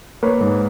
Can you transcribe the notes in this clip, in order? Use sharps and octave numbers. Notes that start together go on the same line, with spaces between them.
A#3 B4 C#5
G#2